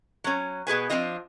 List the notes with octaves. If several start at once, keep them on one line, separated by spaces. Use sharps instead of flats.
F#3 C#4
B2 G#4 B4 G#5
F3 G#3 C4 D4 F4 D#5